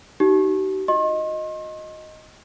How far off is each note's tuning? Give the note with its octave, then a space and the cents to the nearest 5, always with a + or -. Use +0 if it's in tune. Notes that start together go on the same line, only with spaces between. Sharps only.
D#4 +0 G4 -45
F#4 -45 D#5 +0 C6 +45